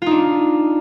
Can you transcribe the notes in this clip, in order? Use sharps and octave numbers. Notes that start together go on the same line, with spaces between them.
D4 D#4 F4